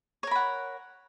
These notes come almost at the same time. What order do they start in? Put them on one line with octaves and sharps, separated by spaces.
C#5 A#4 B5 F#5